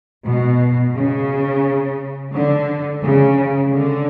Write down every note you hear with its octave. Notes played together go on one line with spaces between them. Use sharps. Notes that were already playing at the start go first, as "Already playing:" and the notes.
B2
C#3
D3
C#3
D3